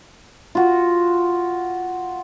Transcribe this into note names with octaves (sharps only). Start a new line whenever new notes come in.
F4 F#4